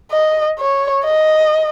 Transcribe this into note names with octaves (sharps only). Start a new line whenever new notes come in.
D#5
C#5
D#5